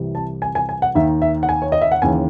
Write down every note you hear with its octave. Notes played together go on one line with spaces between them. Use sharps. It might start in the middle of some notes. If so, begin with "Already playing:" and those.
Already playing: C2 C3 E3
A5
G#5
G#5
G#5
F#5
D#2 D#3 E5
E5
F#5
G#5
C#5
D#5
E5
F#5
D#2 C#3 E3 G#5